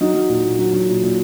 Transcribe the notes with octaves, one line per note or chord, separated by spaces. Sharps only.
F#3 D#4
F#3
A#2
A#2
F#3
F#3
A#2
A#2